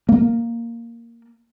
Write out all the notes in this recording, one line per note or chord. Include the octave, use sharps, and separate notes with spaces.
A#3